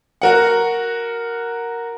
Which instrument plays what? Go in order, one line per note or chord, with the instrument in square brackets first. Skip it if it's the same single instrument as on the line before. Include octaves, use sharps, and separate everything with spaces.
[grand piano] F#4 A#4 F#5